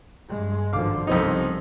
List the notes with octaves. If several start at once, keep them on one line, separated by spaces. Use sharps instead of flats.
G2 G#3
G#1 D3 F3 F5 D6
C2 F2 C#3 C4 D#4